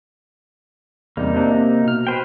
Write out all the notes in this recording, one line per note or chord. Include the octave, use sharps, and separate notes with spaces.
E2 C3 G3 A#3 D#4
C3 D4
C3
B2 F6
B4 C5 G5